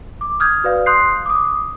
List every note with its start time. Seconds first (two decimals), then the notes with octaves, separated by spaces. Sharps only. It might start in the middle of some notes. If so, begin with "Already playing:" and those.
0.21 D6
0.40 D#6 F6 G6 G#6
0.64 F#4 B4 D5 F5
0.86 C6 D#6 F#6 G6 C7
1.26 D6 D#6